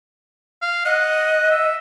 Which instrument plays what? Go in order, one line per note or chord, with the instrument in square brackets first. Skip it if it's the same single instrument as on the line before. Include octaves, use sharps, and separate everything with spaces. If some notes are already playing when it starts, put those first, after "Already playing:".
[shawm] F5
[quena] D#5 [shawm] F#5
[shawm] E5